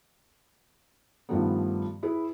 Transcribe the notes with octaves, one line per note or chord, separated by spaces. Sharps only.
G2 D#3 F3 G3 A3 B3
E4 G#4 B4